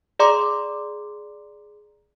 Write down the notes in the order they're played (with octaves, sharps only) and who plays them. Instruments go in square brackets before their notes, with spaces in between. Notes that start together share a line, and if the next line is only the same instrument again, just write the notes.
[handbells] G#4 D5 A#5 C6 D6